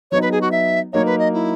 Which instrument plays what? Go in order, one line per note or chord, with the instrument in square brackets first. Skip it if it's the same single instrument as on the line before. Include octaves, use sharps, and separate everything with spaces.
[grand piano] F#3 B3 D#4 [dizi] C#5
[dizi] B4
G#4
F#4
E5
[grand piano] F#3 A#3 D#4 [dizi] C#5
[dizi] B4
D#5
E4